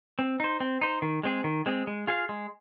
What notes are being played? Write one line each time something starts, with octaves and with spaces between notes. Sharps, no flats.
C4
D#4 C5
C4
D#4 C5
D#3
G#3 C4 G#4
D#3
G#3 C4 G#4
G#3
F4 G#4 F5
G#3